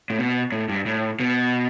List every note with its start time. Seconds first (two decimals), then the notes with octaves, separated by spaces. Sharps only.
0.10 A2
0.19 B2
0.52 A2
0.69 G2
0.86 A2
1.20 B2